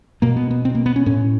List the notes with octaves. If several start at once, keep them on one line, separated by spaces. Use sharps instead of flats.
B2 A#3
B3
B3
C4
A#3
B3
C#4
A2 C#4